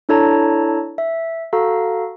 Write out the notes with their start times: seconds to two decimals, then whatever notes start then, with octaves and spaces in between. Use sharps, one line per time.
0.09 D4 E4 A4 C#5 A5 A#5
0.98 E5
1.53 F#4 A4 F5 A#5